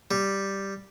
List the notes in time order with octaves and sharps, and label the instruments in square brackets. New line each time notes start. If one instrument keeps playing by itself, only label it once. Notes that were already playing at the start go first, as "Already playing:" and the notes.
[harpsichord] G3